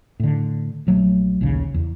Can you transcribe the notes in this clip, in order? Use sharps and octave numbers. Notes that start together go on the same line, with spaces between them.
A2 D3
A#1 F#3 A3
A#1 D#2 C#3
E2